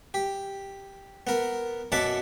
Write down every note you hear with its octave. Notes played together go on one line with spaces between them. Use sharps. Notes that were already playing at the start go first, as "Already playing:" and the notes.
G4
B3 A#4
F#2 B2 E5 F#5 A5 D6